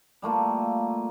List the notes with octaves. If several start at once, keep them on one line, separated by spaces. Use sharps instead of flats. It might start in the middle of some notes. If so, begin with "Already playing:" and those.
G3 A3 A#3 F4